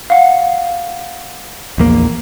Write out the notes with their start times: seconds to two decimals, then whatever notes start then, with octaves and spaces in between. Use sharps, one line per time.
0.10 F5 F#5
1.78 A#1 E2 A#3